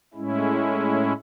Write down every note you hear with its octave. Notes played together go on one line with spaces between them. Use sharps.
A2 G#3 C#4 E4